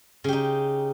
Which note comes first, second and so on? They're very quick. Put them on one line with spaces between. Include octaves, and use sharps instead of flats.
C#3 G4 D#4